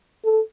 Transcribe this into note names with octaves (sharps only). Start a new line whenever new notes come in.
A4